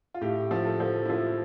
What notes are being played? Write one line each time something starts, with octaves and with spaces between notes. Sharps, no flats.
F4
A2 G4
F3
A4
F3
E4
F3 F4